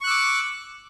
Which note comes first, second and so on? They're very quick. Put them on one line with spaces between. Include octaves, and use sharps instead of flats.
C#6 F#6 E6 D6